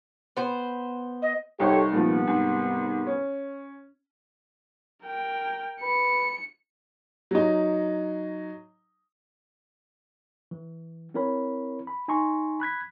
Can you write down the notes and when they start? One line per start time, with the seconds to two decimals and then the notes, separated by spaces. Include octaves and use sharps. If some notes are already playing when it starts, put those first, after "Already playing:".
0.37 B3 C5
1.22 D#5
1.60 C2 D#4 G4 A4 C5 C#5
1.92 C2 A#2 D#3 F3 B3
2.27 G#2
3.07 C#4
5.03 A#4 G5
5.82 B4 C#7
7.31 F#3 D#4
10.51 E3
11.14 C4 E4 A#4 C#5 B5
11.87 B5
12.08 D#4 G#5 A#5 C6 C#6
12.60 B5 F#6 G#6 B6